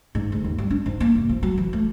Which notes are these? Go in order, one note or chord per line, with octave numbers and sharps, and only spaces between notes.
G#2
D2
D#2
G3
D4
G#2
A#3
F1
F3
F#3
E3
A3